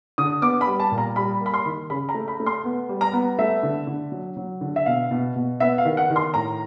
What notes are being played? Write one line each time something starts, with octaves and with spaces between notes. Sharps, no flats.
D3 D#6
B3 D6
B5
G3
A5
A#2
A#5
G3 B5
A#3
B5
C6
D#3
C#3 B5
A#5
A3
B5
A3
C6
B3
G3
A#5
B3
A3 E5
D3
D3
F#3
F#3
D3
E5
B2 F5
B2
B2
B3 E5
F5
D#3
F#5
D#3
C6
A2 A#5